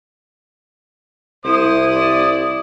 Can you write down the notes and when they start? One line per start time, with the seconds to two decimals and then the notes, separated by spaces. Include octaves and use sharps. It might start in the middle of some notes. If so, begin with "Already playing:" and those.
1.45 C2 E4 C5 D#6
1.96 D5